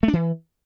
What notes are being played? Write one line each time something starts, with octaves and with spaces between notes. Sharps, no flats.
A3
D4
E3